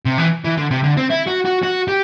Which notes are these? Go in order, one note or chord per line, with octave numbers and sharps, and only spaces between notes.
C3
E3
E3
D3
C3
D3
C4
E4
F#4
F#4
F#4
G4